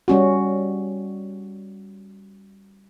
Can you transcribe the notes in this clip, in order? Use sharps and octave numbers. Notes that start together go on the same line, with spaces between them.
G3 C#4 F#4